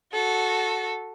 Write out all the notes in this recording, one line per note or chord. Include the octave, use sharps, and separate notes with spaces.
F#4 A4